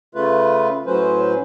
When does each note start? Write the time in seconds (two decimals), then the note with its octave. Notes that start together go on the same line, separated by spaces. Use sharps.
0.15 C#3 A3 F4 B4
0.86 A2 F#3 C#4 B4 C5